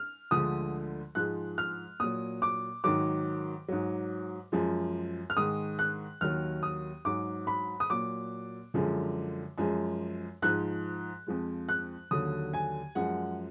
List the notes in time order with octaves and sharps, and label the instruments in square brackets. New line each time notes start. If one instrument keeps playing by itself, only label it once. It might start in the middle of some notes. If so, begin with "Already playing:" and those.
Already playing: [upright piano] F6
D2 D3 F3 G#3 D#6
G#2 F3 G#3 F#6
F6
A#2 F#3 D#6
D6
G#2 D#3 F#3 D6
G#2 F#3
F#2 F3 G#3
F6
G#2 D#3 G#3 D#6
F#6
D#2 D#3 F#3 F6
D#6
G#2 F#3 D6
B5
D#6
A#2 F#3 D6
F#2 D3 F3 G#3
F#2 F3 G#3
G#2 F3 G#3 F#6
F2 F3 G#3
F#6
D#2 D3 F#3 D#6
G#5
F#2 F3 G#3 F#5